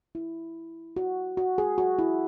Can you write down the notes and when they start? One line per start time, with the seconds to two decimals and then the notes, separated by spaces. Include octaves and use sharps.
0.15 E4
0.96 F#4
1.37 F#4
1.58 G#4
1.78 F#4
1.99 E4